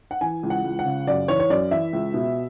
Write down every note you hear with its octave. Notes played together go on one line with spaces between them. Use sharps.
F#5
E3 G#5
C#2
F#5
C#2
F#5
C#3
F#2 D5
E3 C#5
C#5
F#2 D5
E3 E5
C#2
B2